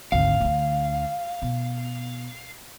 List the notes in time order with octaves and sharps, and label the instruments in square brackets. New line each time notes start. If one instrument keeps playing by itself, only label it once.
[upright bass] G#1 D2 [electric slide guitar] F5
[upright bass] D2 D3
B2